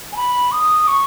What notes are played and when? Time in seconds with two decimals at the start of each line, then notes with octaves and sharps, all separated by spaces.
0.12 G#5
0.16 B5
0.52 D#6
0.88 C#6